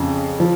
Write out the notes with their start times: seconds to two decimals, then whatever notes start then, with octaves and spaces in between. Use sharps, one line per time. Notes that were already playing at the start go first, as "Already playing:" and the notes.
Already playing: F2 C#3 C#4
0.40 F3